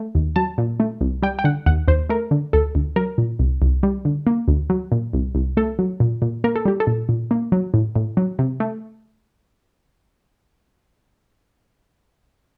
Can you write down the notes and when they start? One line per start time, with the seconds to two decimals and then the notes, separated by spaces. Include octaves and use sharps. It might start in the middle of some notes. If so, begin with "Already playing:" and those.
Already playing: A3
0.15 D#2
0.36 F#3 A5
0.58 A#2
0.80 A3
1.01 C2
1.22 G3 G5
1.39 G5
1.44 D3 F#5
1.66 D#2 F#5
1.88 D#2 C5
2.10 A3 A#4
2.31 D3
2.53 D2 A4
2.75 D2
2.96 F#3 A#4
3.18 A#2
3.39 C2
3.62 C2
3.83 G3
4.05 D3
4.27 A#3
4.48 D2
4.70 F#3
4.92 A#2
5.13 C2
5.35 C2
5.57 A3 A4
5.79 F#3
6.00 A#2
6.22 A#2
6.44 A#3 A#4
6.56 A4
6.65 G3 G4
6.80 A4
6.87 A#2
7.09 A#2
7.31 A#3
7.52 F#3
7.74 A2
7.96 A2
8.17 F#3
8.39 C3
8.60 A3